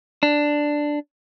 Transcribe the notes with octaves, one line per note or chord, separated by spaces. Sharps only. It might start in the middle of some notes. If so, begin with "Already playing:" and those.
D4